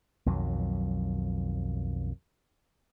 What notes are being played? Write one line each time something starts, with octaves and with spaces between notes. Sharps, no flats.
B1 F2 D#3 F#3